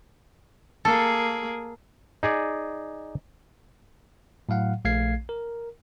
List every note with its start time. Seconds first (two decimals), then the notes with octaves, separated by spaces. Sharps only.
0.85 A#3 G#4 A4
2.23 D#4 G#4 D5
4.49 A2 F#3 F5 F#5
4.85 A#1 A3 F5 G#6 C7
5.29 A#4